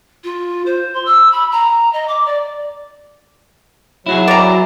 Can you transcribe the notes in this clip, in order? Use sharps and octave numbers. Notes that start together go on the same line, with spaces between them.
F4
C5
C6
E6
B5
A#5
D#5
D6
D5
F#3 E4 F#4 G#4
D5 A#5